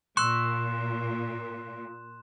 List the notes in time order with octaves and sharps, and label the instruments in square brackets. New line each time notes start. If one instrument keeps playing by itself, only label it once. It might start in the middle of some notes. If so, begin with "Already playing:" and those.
[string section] A#2 [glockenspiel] C6 F#6 E7 [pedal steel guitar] C#6 E6